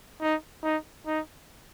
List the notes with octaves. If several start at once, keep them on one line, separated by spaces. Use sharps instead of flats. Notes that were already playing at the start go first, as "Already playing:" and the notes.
D#4
D#4
D#4